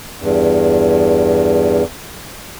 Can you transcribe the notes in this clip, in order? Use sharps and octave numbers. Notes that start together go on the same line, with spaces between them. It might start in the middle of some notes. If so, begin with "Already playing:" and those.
E2 G2